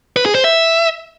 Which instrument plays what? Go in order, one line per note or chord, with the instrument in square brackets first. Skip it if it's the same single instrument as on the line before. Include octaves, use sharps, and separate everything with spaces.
[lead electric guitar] B4
G#4
C5
E5